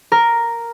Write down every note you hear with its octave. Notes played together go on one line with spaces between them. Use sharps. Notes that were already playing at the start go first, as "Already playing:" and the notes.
A#4